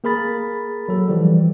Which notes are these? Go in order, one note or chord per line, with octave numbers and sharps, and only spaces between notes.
A#3 G#4 A#4 B5 A6
F#3 A4
E3 F3 G3